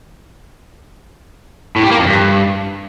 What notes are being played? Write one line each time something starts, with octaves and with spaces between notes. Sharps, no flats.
A2
G3
A#3
F2
G2